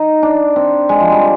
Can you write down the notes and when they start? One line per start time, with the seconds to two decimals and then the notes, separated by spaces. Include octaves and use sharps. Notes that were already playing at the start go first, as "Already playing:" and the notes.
Already playing: D#4
0.23 D4
0.56 C4
0.89 G#3
1.00 F3
1.11 G3